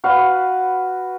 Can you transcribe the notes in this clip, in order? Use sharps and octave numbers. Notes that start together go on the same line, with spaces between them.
F#4 B4 F5 F#5